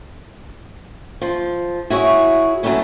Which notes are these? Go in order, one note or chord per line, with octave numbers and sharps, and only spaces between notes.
F3
E4 F#4 G#4 C#5
F#3 A3 B3 C#4 E4